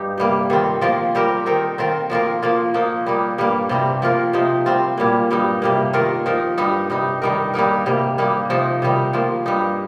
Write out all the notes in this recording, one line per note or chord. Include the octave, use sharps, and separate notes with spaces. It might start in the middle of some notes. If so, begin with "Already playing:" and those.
Already playing: G2 D#4 G4
C3 G3 A#3
D#3 G3 C4 F4
F3 A#3 F4 A#4
G3 C4 G4 A#4
D#3 C4 D#4 A#4
D#3 C4 F4 A#4
F3 A#3 F4 A#4
F3 A#3 F4
F3 A#3 D#4
G3 A#3 D#4
G2 G3 A#3
C3 G3 C4
F3 A#3 F4 A#4
C3 F3 D#4
G3 C4 F4
A#2 G3 A#3
G2 G3 D#4
C3 G3 A#3
D#3 A#3 F4 A#4
F3 D#4 A#4
G2 G3 D#4
C3 G3 D#4
D#3 G3 D#4 A#4
G3 A#3 D#4 A#4
C3 G3 A#3
G3 A#3 D#4
C3 F3 D#4
C3 D#3 G3 D#4
F3 A#3 F4
G2 G3 D#4